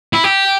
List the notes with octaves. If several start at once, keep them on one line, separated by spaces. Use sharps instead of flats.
E4
G4